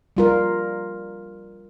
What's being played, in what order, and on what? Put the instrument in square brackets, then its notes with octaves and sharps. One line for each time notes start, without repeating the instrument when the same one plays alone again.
[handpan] G3 F4 A#4